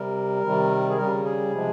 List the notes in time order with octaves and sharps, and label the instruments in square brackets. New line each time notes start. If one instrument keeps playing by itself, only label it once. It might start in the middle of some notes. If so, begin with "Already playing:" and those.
Already playing: [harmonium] C3 G3 A#4
C3 D#3 G3
G#4
C#3 G3 A#4
G#4
C3 F3 G#3